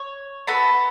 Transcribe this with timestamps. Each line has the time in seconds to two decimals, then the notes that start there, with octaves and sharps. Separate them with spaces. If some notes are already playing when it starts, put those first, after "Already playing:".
Already playing: C#5
0.47 B3 F#4 A4 B5